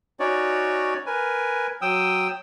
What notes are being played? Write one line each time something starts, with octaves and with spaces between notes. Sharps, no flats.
C#4 D#4 F#4 C#5 D5
A#4 B4 G#5
F#3 G5 D#6 E6